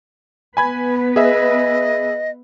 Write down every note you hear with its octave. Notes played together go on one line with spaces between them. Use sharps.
B3 B4 G#5 B5 G#6
G#4 D#5 E5